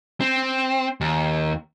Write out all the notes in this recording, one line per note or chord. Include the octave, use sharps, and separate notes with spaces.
C4
D#2